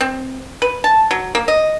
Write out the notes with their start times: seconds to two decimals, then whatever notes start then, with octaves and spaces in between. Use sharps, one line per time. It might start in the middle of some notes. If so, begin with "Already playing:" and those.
0.01 C4
0.62 B4
0.84 A5
1.11 F#3
1.35 A#3
1.48 D#5